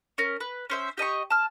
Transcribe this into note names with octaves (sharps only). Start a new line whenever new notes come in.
C#4 A#4
B4
C#4 C5 E5
G4 D#5 A5 C#6
A5 F6